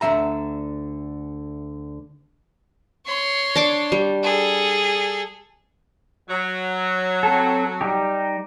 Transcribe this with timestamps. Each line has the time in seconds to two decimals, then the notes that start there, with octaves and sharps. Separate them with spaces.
0.01 D2 D3 E3 E5 A#5
3.06 C#5 C6
3.55 D4 A5 D6
3.92 G3
4.23 G#4 A4
6.29 F#3
7.23 C4 A4
7.81 G3 D#4 G4